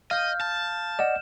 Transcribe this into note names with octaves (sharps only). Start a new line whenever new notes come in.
D#5 F5 F6 G6
A5
D5 D#5 F#5 E7